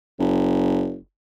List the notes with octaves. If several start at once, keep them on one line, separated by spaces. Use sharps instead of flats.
F#1